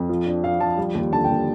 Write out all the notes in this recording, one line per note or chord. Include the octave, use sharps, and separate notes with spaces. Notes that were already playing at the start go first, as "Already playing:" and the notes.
Already playing: F2
F3
D4
F3 F5
F3 A5
G3
D#2
D3 A5
G5
D#2